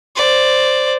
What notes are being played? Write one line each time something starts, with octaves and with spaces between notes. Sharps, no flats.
C5 D5